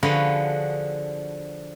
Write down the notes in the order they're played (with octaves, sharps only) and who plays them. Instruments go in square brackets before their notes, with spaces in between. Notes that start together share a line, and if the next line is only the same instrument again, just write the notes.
[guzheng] D3 F3 F#4 G#4 B4